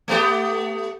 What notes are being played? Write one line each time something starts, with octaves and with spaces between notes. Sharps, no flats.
A3 B3 G4